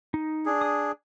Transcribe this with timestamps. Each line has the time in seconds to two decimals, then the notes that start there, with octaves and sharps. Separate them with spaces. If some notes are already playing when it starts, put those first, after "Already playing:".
0.14 D#4
0.46 D4 G#4
0.61 D#6